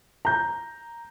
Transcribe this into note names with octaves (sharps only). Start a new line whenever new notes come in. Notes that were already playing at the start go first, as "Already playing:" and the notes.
A#5 G6